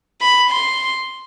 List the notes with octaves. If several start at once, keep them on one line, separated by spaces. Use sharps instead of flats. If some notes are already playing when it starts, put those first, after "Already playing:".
B5
C6